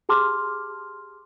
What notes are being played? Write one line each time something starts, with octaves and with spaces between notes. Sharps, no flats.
G4 G#4 A5 C6 D6 F6